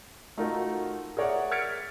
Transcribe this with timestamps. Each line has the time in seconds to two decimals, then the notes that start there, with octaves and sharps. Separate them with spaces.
0.37 A3 D#4 F4 F#4 A#4
1.17 G#4 A#4 C#5 D5 E5 F#5
1.52 F6 G#6 A6 B6 C#7 D7